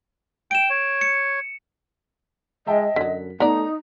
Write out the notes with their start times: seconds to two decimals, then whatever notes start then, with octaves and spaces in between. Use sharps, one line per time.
0.51 G5 D7 E7
0.70 C#5
1.01 C#7
2.67 G#3 D#5 E5 G5 A5
2.96 F#2 D3 F#3 B6
3.40 A3 B3 D#4 D5 A#5